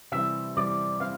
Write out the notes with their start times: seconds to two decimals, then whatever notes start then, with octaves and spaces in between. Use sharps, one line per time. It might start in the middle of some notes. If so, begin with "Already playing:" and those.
0.12 C3 E3 G3 C4 E4 E5
0.57 C3 E3 G3 C4 E4 D5
1.00 G3 C4 E4 F5